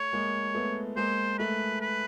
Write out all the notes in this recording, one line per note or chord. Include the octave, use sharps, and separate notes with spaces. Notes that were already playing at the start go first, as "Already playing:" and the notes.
Already playing: A3 C#5
G#3 A#3
A3 B3
G#3 A#3 C5
A3 B4
B4